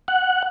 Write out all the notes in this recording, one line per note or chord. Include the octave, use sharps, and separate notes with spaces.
F#5